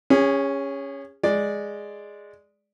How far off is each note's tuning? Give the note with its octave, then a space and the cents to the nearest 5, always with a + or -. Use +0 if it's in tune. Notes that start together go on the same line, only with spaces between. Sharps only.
C#4 +0 G#4 -35
G#3 +0 D5 +0